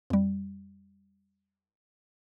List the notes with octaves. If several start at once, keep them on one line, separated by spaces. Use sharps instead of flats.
F2 G3